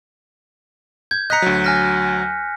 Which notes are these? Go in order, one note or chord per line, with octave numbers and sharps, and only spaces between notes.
G6 G#6
D#5 A#5 F#6 B6 C#7
D2 F#3
G#5 F6 A#6